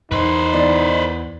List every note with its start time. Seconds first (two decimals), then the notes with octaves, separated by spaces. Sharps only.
0.12 E2 D#4 B4 C5
0.53 E3 B3 D5